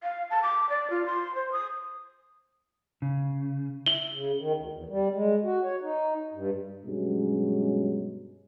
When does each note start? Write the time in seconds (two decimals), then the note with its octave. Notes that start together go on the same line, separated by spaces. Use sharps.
0.03 F5
0.30 A5
0.43 D6
0.70 D5
0.90 F4
1.06 C6
1.35 C5
1.52 D#6
3.02 C#3
3.86 E4 F#7 G7
4.11 C#3
4.40 D#3
4.58 D2
4.73 E2
4.90 G3
5.13 G#3
5.44 F#4
5.64 C#5
5.82 D#4
6.34 G2
6.85 G2 B2 F#3 G#3 C#4